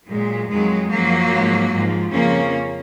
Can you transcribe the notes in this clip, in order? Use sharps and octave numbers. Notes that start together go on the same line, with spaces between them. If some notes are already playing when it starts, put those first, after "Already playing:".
A#2 F#3 G#3
F2 D#3 F#3 G#3
F#2 F3 F#3 A#3
G#2 F3
G#2 F3
F2 C#3 F3 A#3 C#4